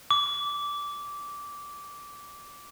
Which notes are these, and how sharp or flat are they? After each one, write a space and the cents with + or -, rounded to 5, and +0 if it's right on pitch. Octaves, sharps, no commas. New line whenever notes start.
D6 -15